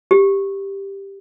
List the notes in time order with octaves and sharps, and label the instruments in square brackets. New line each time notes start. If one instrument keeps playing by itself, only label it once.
[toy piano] G4